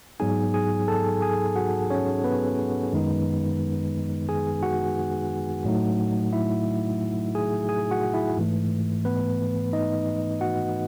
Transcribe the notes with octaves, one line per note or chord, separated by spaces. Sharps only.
G#2 F#3 B3 D#4 G#4 G#5
G#4 G#5
A4 A5
G#4 G#5
F#4 F#5
C#4 C#5
B3 B4
F#2 D#3 G#3 D#4
G#4 G#5
F#4 F#5
A2 F#3 A3 D#4
E4 E5
G#4 G#5
G#4 G#5
F#4 F#5
E4 E5
G#2 E3 A3
B3 B4
D#4 D#5
F#4 F#5